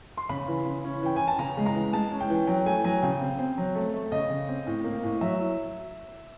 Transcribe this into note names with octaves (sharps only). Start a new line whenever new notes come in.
C6
C#3 B5
E3
C#3
C#4
E3 G5
E3 G#5
A5
C#3 A#5
G#3
A#5
E3
G#3 A5
C#4
G5
E3
F#3 G5
A3 G#5
F#3 G#5
C#3 G5
C4
C4
F#3
A3
A3
C#3 D#5
C#3
C4
A2
A#3
A2
F#3 E5